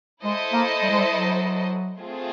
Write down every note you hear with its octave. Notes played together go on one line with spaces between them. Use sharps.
G#3 E4 A4 C5 D#5
A#3
G3
G#3
G3
F#3
A3 C4 F4 G#4